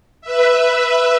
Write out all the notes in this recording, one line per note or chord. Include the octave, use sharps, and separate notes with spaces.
B4 E5